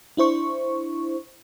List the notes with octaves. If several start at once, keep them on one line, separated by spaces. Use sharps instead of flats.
D4 E4 C5 C#6